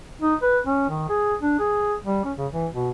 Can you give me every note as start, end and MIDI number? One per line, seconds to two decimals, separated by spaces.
0.22 0.35 63
0.42 0.59 71
0.66 0.89 61
0.90 1.04 51
1.09 1.35 68
1.41 1.55 62
1.59 1.95 68
2.05 2.22 55
2.25 2.33 61
2.38 2.47 49
2.52 2.67 52
2.73 2.90 47